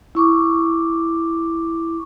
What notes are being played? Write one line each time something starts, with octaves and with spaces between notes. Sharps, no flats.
E4 C#6 D6